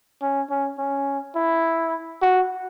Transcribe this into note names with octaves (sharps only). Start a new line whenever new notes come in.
C#4
C#4
C#4
E4
F#4